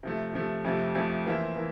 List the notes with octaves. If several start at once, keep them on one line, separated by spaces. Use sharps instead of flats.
C3 F3 A3
C3 F3 A3
F2 C3 F3 A3
F2 C3 F3 A3
E3 A#3 F4 C5 E5
E3 A#3